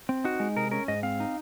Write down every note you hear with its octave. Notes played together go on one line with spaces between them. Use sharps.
C4
D#4 F#4
G#3
C3 A#4
C#4 A#4
G#2 D#5
C4 F5
D#4